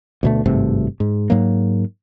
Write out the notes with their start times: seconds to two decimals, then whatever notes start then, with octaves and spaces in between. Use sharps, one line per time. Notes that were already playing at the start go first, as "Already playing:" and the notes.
0.23 D2 B2 A3
0.46 G#1 G2 C3 A3
1.00 G#2
1.30 G#2 F#3 A#3